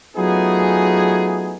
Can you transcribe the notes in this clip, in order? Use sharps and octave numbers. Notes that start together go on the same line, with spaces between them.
F#3 A3 B3 D#4 F4 G#4